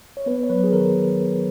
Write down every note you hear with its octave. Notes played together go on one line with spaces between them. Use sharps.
C#5
B3 B4
C#5
F#3 B4
G#4
D#3 A#4